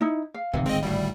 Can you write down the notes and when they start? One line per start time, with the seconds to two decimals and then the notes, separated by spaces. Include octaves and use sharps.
0.01 D#4 E4
0.34 F5
0.53 D1 G#1 E2 C3 D#3
0.66 G#3 C4 D#5
0.83 D2 A2 G3